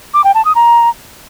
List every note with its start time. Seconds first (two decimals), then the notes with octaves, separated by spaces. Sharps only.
0.14 D6
0.24 G5
0.34 A5
0.45 D#6
0.55 A#5